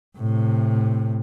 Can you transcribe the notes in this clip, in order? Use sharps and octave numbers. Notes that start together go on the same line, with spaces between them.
A2 C3